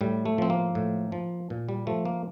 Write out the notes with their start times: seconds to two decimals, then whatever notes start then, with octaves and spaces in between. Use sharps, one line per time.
0.01 A2 G3
0.26 A3
0.38 F3 C4
0.50 A#3
0.75 A2
1.12 F3
1.50 A#2
1.69 G3
1.87 F3 A3
2.05 A#3